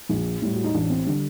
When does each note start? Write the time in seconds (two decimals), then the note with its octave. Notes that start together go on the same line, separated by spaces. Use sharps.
0.09 A#1
0.42 A2 G3
0.55 F#4
0.64 D#4
0.74 A1 D4
0.90 C4
1.06 D3 G3 D4